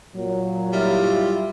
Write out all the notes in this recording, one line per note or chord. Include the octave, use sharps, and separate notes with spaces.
A#2 F#3
G3 E4 F4